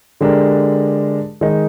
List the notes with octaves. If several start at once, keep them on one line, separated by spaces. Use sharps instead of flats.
D3 G#3 D4 G4 A#4
D#3 G#3 D#4